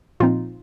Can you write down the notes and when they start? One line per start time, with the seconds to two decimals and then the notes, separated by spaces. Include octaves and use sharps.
0.20 A#2 F3 C4 D#4 F4